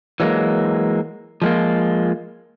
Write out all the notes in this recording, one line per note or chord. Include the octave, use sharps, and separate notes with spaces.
E3 F#3 G#3 A#3
F3 G#3 A#3 F4